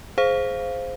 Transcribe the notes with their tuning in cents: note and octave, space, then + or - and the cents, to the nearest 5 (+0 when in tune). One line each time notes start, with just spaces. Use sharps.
G#4 +15 C5 +0 F5 -5